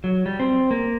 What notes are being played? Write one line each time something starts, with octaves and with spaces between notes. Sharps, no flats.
F#3
G3
C4
A#3